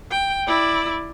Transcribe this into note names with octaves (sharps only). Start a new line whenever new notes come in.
G5
E4 D5